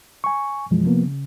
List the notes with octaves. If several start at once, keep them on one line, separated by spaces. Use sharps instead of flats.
G#5 C#6
F#2 B2 E3 F3 G#3
C3 F3 A#3 B3
C#3